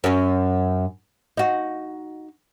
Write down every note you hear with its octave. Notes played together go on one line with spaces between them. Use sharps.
F#2 C#4
D#4 F#4